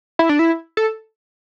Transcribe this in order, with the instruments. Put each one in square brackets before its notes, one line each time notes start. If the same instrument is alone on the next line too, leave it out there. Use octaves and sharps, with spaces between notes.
[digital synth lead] E4
D4
E4
A4